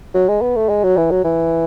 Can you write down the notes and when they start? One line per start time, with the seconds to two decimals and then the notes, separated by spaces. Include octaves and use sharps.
0.14 F#3
0.28 G#3
0.41 B3
0.56 A3
0.69 G#3
0.84 F#3
0.97 E3
1.11 F#3
1.25 E3